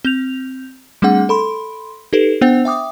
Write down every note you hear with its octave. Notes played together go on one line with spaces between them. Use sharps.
C4 G6 F7
G3 A3 C4 D4 G#4 F#5
A4 B5 C6
D#4 G4 A4 B4
B3 D4 C5 F#5 G5
E5 G5 D6 D#6